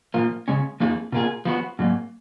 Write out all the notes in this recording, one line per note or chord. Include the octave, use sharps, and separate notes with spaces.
A#2 F3 A#3 F4
C#3 G#3 C#4
F2 F3 A#3 D#4 G#4
B2 A#3 F4 G#4
F3 B3 F#4
G#2 F#3 A#3